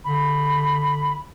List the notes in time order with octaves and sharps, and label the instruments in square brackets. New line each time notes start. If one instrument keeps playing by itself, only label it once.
[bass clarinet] D3 [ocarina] B5